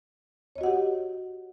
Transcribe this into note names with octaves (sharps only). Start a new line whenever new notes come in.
F#4 G4 C#5 D#5 F#5